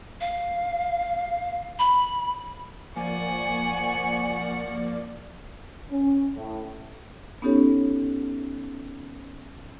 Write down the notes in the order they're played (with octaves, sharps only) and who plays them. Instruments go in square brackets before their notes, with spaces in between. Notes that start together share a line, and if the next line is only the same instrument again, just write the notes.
[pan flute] F5
B5
[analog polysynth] F3 A#3 D5 [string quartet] F#5 C#6 [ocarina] G#5
[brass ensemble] C#4
A2
[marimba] B3 C#4 D#4 G4 A4 C#5